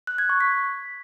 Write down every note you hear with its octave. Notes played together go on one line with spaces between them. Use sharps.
F#6
G#6
C#6
B6